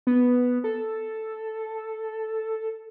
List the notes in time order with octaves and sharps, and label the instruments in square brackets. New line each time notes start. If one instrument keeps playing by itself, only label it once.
[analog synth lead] B3
A4